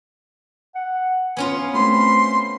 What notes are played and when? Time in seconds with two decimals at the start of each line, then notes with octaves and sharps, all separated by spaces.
0.75 F#5
1.37 B3 C#4 F4 G#5
1.74 A3 C4 B5 C6